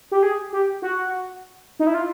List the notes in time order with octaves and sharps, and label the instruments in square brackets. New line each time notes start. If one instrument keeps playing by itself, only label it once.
[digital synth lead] G4
G#4
G4
F#4
D#4
E4
F4